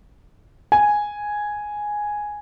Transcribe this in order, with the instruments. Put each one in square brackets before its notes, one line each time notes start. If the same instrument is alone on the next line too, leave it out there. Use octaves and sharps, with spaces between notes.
[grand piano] G#5